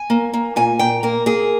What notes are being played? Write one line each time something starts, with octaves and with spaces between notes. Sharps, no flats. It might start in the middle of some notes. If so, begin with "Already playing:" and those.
Already playing: G#5
A#3
A#3
A#2 G#5
A#2 G5
A#3 A#4
A#3 G#4